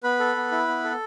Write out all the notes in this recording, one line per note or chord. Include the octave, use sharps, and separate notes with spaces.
B3 B4 B5
A4
B3
E4
B3
A4